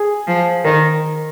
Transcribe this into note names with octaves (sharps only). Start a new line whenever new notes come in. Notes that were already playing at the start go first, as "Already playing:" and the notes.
Already playing: G#4
F3
D#3 A#4